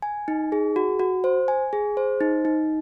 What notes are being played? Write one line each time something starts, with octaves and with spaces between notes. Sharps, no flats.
G#5
D#4
G#4
F#4
F#4
C5
G#5
G#4
C5
D#4
D#4